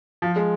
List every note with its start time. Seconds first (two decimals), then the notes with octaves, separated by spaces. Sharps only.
0.22 F3
0.36 G#3